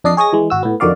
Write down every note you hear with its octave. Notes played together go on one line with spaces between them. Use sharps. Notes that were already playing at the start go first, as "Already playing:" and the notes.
F2 D4 D5 D#5 C7
G#4 C#5 D#5 G#5 A#6
E3 G#3
G#1 F#4 E6
A2 B3
F2 D3 D#3 F#4 D5 F5